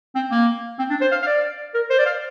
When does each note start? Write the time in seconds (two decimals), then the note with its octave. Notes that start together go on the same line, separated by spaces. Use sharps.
0.15 C4
0.31 A#3
0.79 C4
0.90 D4
1.01 C5
1.11 F5
1.22 F5
1.27 D5
1.74 A#4
1.90 C5
1.98 D5
2.06 F5